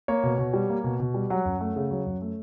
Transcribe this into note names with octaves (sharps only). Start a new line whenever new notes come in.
A#3 C#5
B2
B2
G3
A#3
B2
B2
G3
F#3 F#5
F#2
A3
C#3
F#3
F#2
A3